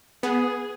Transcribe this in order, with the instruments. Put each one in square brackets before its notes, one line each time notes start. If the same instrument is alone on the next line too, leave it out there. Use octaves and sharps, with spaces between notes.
[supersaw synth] B3 [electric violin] G#4